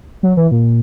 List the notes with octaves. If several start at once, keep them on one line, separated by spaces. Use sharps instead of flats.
F#3
E3
A#2